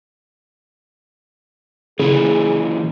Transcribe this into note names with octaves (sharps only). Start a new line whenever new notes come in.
A#2 C#3 E3 G#4